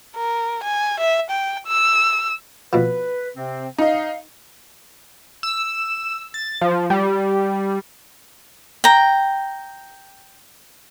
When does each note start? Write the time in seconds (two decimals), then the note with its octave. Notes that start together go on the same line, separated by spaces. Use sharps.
0.15 A#4
0.63 G#5
1.00 E5
1.30 G5
1.67 E6
2.73 B2 F3 B4
3.36 C3 C4
3.78 D#4 D#5 F5
5.43 E6
6.34 A6
6.61 F3
6.90 G3
8.84 G5 A#5